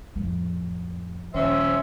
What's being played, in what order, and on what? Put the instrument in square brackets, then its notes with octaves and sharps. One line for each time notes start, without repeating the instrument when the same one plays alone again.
[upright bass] F2 A2
[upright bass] D#1 D#3 [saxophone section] F3 C4 C#4 [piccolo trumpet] E5